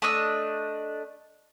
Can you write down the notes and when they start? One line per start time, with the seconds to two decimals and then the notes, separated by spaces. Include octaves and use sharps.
0.02 A3 D4 D#5 E6